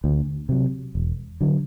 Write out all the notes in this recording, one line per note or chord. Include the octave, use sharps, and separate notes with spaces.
D2
C3 F#3
E1
D3 F#3